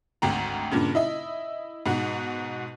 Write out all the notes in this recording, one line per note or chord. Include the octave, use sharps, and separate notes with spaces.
G#1 D2 G5 A#5
G2 A#2 C#3
E4 D#5 E5
G#2 B2 F#4